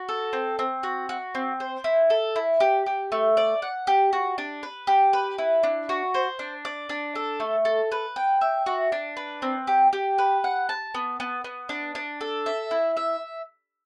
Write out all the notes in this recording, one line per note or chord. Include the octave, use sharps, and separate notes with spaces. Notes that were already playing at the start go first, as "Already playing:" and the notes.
Already playing: F#4
A4
C4
C4
F#4
F#4
C4
C5
E4
A4
E4
G4
G4
A3
D5
F#5
G4
F#4
D4
B4
G4
B4
E4
D4
F#4
C5
D4
D5
D4
A4
A3
A4
B4
G5
E5
F#4
D4
B4
C4
G4
G4
B4
F#5
A5
B3
B3
B3
D4
D4
A4
E5
E4
E5